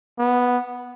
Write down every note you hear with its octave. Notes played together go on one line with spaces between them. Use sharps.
B3